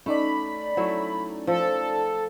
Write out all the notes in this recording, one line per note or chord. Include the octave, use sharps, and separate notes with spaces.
A3 C#4 D#4 D5 B5
F#3 A3 E4
F3 A4